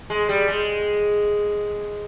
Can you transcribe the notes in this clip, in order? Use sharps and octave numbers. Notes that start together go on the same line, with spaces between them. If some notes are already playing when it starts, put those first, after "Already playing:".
G#3
G3
G#3